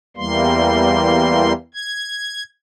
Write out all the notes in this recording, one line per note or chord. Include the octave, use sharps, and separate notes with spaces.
E2 E3 G3 A#3 C6
G#6